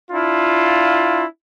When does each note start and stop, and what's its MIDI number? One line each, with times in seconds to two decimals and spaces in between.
0.11 1.25 62
0.11 1.25 64
0.11 1.25 65